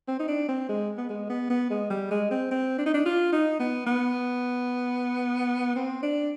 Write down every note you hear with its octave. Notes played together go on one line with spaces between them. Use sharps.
C4
D#4
D4
C4
G#3
B3
G#3
B3
B3
G#3
G3
G#3
C4
C4
D4
D#4
D4
F4
D#4
B3
B3
C4
D4